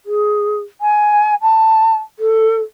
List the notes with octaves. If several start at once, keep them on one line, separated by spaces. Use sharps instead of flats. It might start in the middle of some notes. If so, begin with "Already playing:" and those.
G#4
G#5
A5
A4